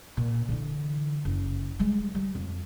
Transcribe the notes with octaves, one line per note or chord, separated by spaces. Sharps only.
A#2
D3 E3
F#1
G3 G#3
G3
F2